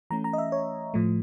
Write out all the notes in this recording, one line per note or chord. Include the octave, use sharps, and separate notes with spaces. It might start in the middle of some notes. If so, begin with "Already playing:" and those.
E3 A3 C#4 A#5
A#5
D#5
E5
C#5
A2 F3 A3